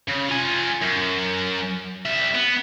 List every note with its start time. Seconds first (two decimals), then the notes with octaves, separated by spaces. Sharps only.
0.08 C#3
0.29 F4 G#5
0.82 F#2
2.05 G3 E5
2.35 B3